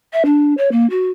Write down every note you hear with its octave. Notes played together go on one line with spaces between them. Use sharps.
E5
D4
C#5
A#3
F#4